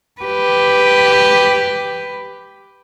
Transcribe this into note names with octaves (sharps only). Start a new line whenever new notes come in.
G4 B4